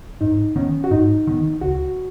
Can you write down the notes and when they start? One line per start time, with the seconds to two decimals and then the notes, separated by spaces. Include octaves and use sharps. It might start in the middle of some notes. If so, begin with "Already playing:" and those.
0.21 G#2 D#4
0.56 D#3 B3 C#4
0.84 F#4
0.91 G#2 D#4
1.27 D#3 B3
1.61 C#2 F#4